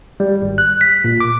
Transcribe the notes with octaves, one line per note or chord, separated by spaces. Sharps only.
G3
G#1
F#6
B6
A#2
D6